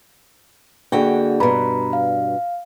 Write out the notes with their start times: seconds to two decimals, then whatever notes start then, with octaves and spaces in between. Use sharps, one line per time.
0.92 D3 A#3 D4 F#4 G#4 G5
1.40 G2 B2 A#5 B5
1.93 F5